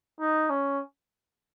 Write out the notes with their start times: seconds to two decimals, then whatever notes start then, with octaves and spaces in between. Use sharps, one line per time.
0.20 D#4
0.50 C#4